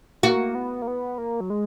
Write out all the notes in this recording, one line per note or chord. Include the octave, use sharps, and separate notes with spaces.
A#3 F#4
B3
A#3
B3
A#3
F#3
G#3